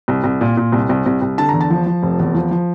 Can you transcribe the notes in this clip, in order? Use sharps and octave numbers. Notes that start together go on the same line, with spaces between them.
C2
C2
A#2
A#2
C2
C2
C2
C2
D3 A5
E2 A#5
A5
F3
F3
F1
E2
F3
F3